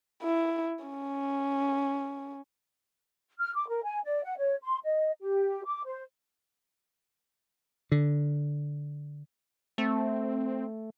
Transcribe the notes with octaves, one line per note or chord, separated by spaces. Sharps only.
E4
C#4
F6
D6
A#4
G#5
D5
F#5
C#5
C6
D#5
G4
D6
C5
D3
A3 C4